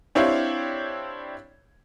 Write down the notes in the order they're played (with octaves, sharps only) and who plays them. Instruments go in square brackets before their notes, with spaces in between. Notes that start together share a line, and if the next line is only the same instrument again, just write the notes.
[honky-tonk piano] C4 D4 E4 G4 C#5 F5